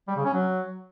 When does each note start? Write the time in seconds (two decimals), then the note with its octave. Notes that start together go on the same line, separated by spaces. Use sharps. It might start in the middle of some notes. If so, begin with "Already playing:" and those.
0.08 G3
0.16 C#3
0.25 C#4
0.33 F#3